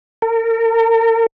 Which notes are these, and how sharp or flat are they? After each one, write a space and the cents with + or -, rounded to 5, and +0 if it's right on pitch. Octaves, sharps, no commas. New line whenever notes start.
A#4 -40